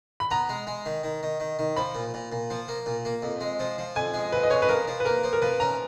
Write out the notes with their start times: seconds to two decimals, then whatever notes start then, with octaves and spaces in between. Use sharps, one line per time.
0.20 B5
0.31 B3 A#5
0.49 G#3
0.67 G#3
0.86 D#3
1.04 D#3
1.23 D#3
1.40 D#3
1.59 D#3
1.76 F3 B5
1.95 A#2
2.14 A#2
2.32 A#2
2.50 F3
2.68 A#3
2.86 A#2
3.05 A#3
3.22 F2
3.41 G#3
3.60 F3
3.78 F3
3.96 F2 G#5
4.14 G#3
4.32 F2 B4
4.43 D#5
4.50 G#3 C#5
4.62 B4
4.69 F3 A#4
4.88 F3
5.00 B4
5.05 A#3 A#4
5.24 F3
5.33 A#4
5.42 F3 B4
5.60 C#4 A#5